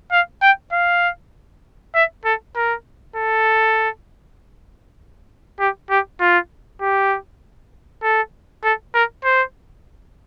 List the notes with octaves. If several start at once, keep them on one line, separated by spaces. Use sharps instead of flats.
F5
G5
F5
E5
A4
A#4
A4
G4
G4
F4
G4
A4
A4
A#4
C5